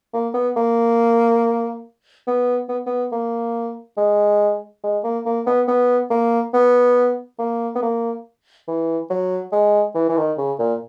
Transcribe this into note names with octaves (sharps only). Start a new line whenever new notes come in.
A#3
B3
A#3
B3
B3
B3
A#3
G#3
G#3
A#3
A#3
B3
B3
A#3
B3
A#3
B3
A#3
E3
F#3
G#3
E3
E3
D#3
C#3
A#2